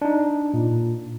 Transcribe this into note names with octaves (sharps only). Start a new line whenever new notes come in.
D4 D#4
A#2